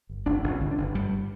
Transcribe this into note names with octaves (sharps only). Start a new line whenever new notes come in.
G1
G1 D4
G1
C#4
D3
D4
G1
G2 G3